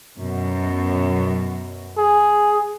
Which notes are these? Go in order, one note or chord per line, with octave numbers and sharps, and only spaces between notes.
F#2 B2
G#4